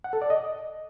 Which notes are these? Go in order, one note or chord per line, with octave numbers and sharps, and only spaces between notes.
F#5
A4
D5
D#5